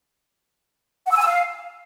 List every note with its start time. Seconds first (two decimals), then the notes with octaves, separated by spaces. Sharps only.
1.06 F#5
1.11 E6
1.16 G#5
1.21 E6
1.26 F5